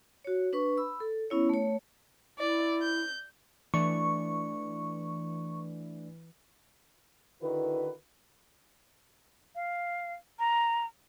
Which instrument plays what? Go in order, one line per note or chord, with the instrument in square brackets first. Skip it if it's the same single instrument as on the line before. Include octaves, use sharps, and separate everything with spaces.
[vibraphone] F#4 C#5
D4 B4 C#6
B5 E6
A4
B3 C#4 E4 C#5
A3 C#5
[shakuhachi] E4 [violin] D5
[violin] G6
[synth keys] E3 [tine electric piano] A3 D4 D5 [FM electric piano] C#6
[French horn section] D3 D#3 E4 F#4 B4
[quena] F5
A#5